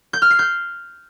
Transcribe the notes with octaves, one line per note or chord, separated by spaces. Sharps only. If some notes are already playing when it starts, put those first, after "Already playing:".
G6
F6
C7
G6